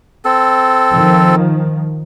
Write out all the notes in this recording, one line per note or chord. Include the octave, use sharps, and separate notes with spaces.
C4 A4
D#3 F3